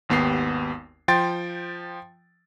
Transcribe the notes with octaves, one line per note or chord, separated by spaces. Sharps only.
G#1 D#2 B3 G4 C7
F3 G5 C6 A6